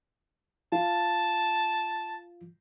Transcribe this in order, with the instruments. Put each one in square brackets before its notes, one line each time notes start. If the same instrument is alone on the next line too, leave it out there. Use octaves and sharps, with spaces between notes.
[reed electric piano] F4 [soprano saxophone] A5